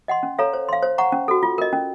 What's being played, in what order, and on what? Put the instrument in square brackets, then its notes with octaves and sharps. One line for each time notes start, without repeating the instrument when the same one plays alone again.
[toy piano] D#5 F#5 C6
C#4
A4 C#5 F5 A#5
C5
F5 C6
C5
F#5 A#5 C#6
C#4
F#4 A4
F4
A#4 D#5
C#4